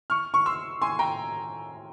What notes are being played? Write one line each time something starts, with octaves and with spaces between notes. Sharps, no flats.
C#6 F6
C#6
C6 E6
G#5 C6
G5 A#5